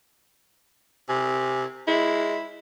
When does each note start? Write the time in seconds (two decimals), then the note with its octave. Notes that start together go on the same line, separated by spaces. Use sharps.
1.09 C3 G#5
1.88 G#3 E4